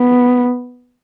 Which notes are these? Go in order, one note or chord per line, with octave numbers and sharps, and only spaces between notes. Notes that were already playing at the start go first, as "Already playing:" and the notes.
Already playing: B3